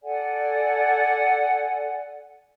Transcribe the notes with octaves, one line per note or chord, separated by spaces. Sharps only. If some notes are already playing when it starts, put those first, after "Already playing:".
A4 D5 F#5 G#5